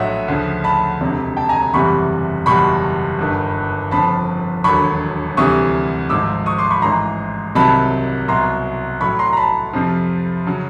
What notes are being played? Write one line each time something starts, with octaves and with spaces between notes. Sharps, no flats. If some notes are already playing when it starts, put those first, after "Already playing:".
Already playing: A#1 A2 F#3 C#5 D#5 E5 F#5
D2 C#3 F3
A5 B5
E1 D2 C3
G5 A5
G#5 A#5
F#1 E2 C3 E3 G3 B5 C#6
F#1 E2 B2 G3 B5 C#6
G1 G2 D#3
G1 F2 C#3 F3 A5 B5
E1 D#2 D3 F#3 B5 C#6
D2 C3 E3 G3 C#6 D#6
G#1 G#2 F3 D6 E6
C#6 D#6
C6 D6
B5 C#6
A1 G#2 E3 A#5 C6
C2 C3 D#3 F#3 A5 B5
C2 B2 F#3 A#5 C6
A1 A2 F#3 B5 C#6
A#5 C6
A#5
A5 B5
F2 C3 F3
C#3 F#3